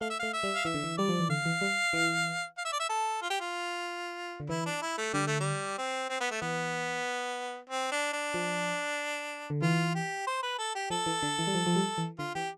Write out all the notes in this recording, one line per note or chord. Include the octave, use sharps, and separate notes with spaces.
A3 F5
E5
A3 F5
E5
G3
F5
E3 E5
D3
E3
G3 D5
F3
E3
D3 F5
E3
G3
E3
F5
E5
D5
E5
A4
F4
G4
F4
D3
E3 E4
D4
E4
A3
D3 G3
A3
G3
C4
C4
B3
A3
E3 B3
C4
D4
D4
F3
D3
E3 F4
G4
C5
B4
A4
G4
F3 A4
E3
D3
E3
G3
F3
F3
G3
E3
D3 F4
E3 G4